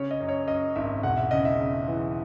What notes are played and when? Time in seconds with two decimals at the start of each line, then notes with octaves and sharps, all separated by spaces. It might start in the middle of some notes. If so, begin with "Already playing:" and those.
Already playing: C#3 C#5
0.11 D#5
0.20 F#2
0.29 C#5
0.47 F#2 D#5
0.75 G#1 E5
1.03 E1 F#5
1.17 E5
1.31 C#3 D#5
1.45 E5
1.60 C#3
1.88 E3